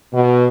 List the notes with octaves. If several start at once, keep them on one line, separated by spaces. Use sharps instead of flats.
B2